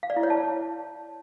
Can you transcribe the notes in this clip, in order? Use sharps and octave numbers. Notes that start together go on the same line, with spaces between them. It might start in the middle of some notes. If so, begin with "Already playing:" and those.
F5
D5
E4
C#5
A5